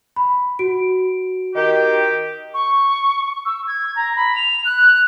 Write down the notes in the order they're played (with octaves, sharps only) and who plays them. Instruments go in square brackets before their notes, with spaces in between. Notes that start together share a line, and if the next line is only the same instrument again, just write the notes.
[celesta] B5
F#4 D7
[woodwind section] D#3 G4
[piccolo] C#6
E6
G#6
A#5
B5
F7
F#6